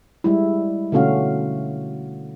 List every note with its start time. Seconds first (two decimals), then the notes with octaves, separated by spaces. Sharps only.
0.24 G3 G#3 E4
0.92 B2 D3 A3 C#4 F#4 F5